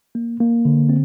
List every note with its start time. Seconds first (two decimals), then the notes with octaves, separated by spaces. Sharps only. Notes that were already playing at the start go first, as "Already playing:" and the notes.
0.15 A#3
0.40 A#3
0.65 D3
0.89 C4